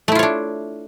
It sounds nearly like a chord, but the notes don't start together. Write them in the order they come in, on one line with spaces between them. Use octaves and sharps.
A3 E4 F4 C#5 D4